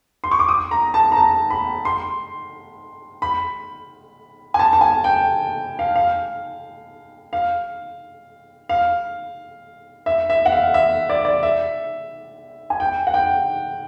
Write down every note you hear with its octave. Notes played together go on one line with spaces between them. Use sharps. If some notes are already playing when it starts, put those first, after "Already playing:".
C6
C#6
D6
D#6
A#5
A5
A#5
A5
B5
C6
B5
G#5
A5
A5
G#5
G5
F5
F5
F5
F5
E5
E5
F#5
F5
E5
D5
D5
E5
G#5
G5
F#5
G5